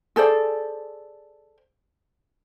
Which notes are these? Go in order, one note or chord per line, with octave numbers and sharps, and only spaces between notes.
G#4 A4 C5 D5